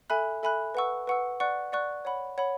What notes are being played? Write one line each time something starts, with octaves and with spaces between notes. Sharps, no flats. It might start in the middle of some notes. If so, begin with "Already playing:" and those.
A4 E5 G#5 B5 F#6
A4 E5 G#5 B5 F#6
B4 F#5 C#6 E6
B4 F#5 C#6 E6
D5 F#5 C#6 F#6
D5 F#5 C#6 F#6
C#5 F#5 B5
C#5 F#5 B5